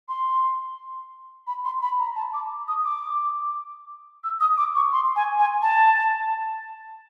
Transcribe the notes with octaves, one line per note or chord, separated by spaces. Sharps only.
C6
B5
C6
B5
A#5
A5
D6
D#6
D6
E6
D#6
D6
C#6
C6
G#5
G#5
A5